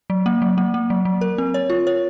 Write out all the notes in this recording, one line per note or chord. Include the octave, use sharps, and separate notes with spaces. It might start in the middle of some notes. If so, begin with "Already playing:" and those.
F#3
A#3
F#3
A#3
A#3
F#3
F#3
A#4
C4
C#5
F4
C#5